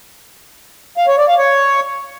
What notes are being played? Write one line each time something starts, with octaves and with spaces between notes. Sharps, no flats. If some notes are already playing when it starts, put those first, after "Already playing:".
F5
C#5
D5
F5
C#5